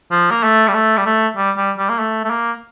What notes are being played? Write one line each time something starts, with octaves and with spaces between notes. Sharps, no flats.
F3
A#3
A3
G3
A3
G3
A3
G3
G3
G3
A#3
A3
A3
A#3